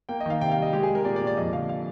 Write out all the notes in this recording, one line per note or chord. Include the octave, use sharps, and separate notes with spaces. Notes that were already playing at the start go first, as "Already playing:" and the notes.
A#3 G5
D#5
D#3 F5
C3 G5
F5
G3
D#5
G#3 G4
G#4
G#3
A#4
A#2 D5
D5
A#2
D5
F2 D#5
D3 F5
F5